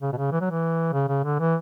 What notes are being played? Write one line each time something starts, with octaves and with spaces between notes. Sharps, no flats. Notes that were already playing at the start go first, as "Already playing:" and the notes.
C#3
B2
C#3
E3
F#3
E3
C#3
C#3
D3
E3